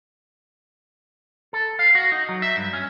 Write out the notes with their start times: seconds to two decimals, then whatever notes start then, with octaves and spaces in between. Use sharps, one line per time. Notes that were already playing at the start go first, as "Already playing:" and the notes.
1.53 A4
1.79 F5
1.95 F#4
2.12 D#4
2.29 F#3
2.42 E5
2.56 G2
2.73 C#4